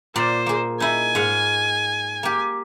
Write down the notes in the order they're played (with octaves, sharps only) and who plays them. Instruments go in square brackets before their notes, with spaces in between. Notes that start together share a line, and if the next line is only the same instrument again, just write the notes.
[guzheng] A#2 D5 A#5 [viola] C5
[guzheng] A#3 G#4
[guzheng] D#4 E4 [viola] G#5
[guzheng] G#2 F5 F#5
A#3 G4